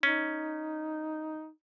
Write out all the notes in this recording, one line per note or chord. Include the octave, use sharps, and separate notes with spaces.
C#4 D#4